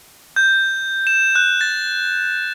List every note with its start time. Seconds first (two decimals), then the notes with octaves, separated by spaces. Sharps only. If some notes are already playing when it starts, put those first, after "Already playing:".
0.36 G6
1.07 E7
1.35 F#6
1.61 A6